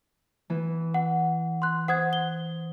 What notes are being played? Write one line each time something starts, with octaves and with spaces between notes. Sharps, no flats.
E3 B3
F#5
C6 F#6
C5 F#5 D#6 G#6
G7